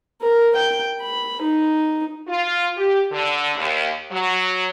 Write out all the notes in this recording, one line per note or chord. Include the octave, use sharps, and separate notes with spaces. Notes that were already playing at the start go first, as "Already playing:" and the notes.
A#4
G5
B5
D#4
F4
G4
D3
D#2
F#3